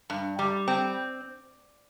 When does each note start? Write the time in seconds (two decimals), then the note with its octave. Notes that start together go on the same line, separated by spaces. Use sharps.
0.10 G2
0.39 G3
0.68 C4